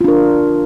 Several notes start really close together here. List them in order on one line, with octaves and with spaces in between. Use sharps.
F4 D4 A#4